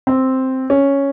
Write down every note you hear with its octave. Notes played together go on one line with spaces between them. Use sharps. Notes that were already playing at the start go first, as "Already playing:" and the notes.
C4
C#4